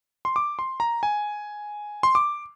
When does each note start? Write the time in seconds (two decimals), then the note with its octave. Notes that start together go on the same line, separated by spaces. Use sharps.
0.25 C6
0.36 D6
0.59 C6
0.80 A#5
1.03 G#5
2.03 C6
2.15 D6